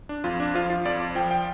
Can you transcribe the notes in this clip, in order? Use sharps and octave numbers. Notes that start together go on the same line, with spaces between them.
D4
F2 F4
D4
F3 F4
F4
F2 D5
F3 G5
G5